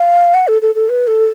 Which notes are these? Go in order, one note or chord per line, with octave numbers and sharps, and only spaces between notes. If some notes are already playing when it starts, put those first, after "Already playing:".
Already playing: F5
F#5
A4
A4
A4
B4
A4